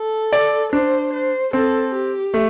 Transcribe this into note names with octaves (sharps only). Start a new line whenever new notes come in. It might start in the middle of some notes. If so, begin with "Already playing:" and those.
Already playing: A4
D5
D4 C5
C5
C4 A4
G4
A3